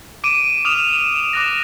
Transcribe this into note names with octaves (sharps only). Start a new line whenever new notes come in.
D6 D7 D#7
D6 D#6 F6 E7 F7
D6 F#6 A#6